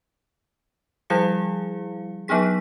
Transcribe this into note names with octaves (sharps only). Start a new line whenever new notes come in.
F3 G3 E4 G#4 F5 C#7
F#3 B3 D4 D#4 G#4 B6